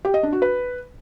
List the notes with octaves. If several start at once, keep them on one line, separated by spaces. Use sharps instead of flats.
G4
D#5
D4
F#4
B4